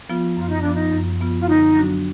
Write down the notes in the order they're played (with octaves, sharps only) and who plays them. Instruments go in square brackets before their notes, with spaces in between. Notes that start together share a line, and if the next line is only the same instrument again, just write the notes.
[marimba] F3 B3 F4
[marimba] F#2 [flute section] F4
[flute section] D#4
[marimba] F3 B3 F4 [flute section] D4
[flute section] D#4
[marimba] F#2
F3 B3 F4
[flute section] F4
[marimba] D3 [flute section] D#4
[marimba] F#3 D4 F#4